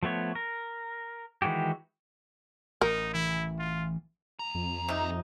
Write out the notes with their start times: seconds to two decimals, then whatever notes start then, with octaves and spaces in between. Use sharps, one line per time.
0.03 F3 A3 B3 C#5
0.35 A#4
1.42 D#3 E3 G#3 F#4 G4
2.81 A1 D#4 A#4
3.14 E3 E4
3.59 F4
4.39 D#2 A#5
4.55 F2
4.88 C3 D#4